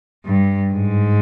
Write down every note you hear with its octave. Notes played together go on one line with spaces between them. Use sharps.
G2
G#2